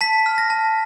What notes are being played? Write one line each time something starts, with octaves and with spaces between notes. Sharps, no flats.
A5 B6
F6
A#6
A5